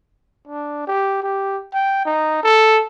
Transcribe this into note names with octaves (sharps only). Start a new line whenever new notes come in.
D4
G4
G4
G5
D#4
A4